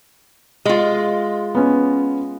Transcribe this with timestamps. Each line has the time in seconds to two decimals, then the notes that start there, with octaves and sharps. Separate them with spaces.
0.65 G#3 F4
1.55 B3 C#4